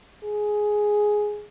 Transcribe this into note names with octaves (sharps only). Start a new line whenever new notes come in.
G#4